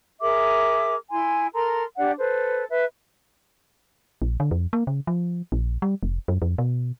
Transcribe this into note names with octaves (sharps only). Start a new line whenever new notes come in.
G#4 A#4 E5 D6
E4 G#5 C6
A4 A#4 A#5 C6
D4 G4 D5 F#5
A4 B4 C5
B4 E5
A#1
D3
F2
A#3
C#3
F3
A#1
G3
F1
F#2
F2
B2